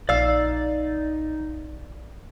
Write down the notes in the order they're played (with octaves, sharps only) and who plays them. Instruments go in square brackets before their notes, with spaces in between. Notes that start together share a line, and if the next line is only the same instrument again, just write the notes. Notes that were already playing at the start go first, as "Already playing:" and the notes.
[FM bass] A#1 [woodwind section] D#4 [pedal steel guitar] D5 E6 [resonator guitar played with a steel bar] F5